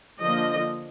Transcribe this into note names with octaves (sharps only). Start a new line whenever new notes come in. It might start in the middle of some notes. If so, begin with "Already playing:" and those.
D3 F3 A#3 D4 F4 D#5